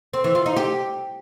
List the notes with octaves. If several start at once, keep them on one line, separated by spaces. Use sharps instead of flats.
C4
E3
F4
D#4
G4